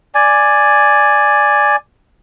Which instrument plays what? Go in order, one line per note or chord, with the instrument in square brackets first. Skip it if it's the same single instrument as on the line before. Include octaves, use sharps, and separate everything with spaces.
[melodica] D5 G#5